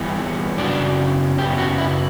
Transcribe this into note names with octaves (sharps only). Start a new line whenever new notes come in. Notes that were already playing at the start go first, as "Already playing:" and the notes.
Already playing: G2 E3 B3
F#2 C#3 F#3 B3 D4
F#2 C#3 F#3 B3 G4
F#4
E4